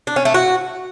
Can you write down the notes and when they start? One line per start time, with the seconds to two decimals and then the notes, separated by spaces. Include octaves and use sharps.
0.07 D4
0.16 C#4
0.25 A3
0.34 F#4